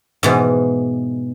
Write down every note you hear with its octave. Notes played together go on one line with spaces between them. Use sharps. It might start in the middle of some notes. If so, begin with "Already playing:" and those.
G#2 B2 E3